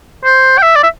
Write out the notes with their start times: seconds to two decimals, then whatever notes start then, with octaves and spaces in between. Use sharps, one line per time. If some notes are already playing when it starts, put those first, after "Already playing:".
0.24 C5
0.58 G5
0.63 E5
0.76 D5
0.83 E5